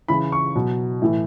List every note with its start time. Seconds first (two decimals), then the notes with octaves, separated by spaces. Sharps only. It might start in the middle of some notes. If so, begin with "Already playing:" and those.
0.08 C#3 E3 B5
0.32 C#6
0.55 B2 F#3
1.02 A2 E3